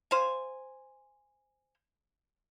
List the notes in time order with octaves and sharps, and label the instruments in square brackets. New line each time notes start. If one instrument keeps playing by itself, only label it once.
[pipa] C5 F5 G#5